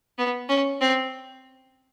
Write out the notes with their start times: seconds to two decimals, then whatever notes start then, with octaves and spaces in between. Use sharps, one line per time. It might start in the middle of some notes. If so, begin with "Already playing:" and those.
0.18 B3
0.49 C#4
0.81 C4